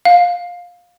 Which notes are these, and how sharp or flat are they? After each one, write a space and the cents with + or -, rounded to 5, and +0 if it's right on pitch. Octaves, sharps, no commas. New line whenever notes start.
F5 +20